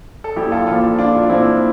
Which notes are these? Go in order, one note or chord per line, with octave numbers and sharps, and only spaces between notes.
A4
A#1 E4 G4
F4 A4
A#2 F3 F4 A4
A#1 D4 F4
F4
A#2 F3 C4 E4